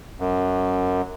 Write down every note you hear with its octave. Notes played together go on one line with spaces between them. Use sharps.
F#2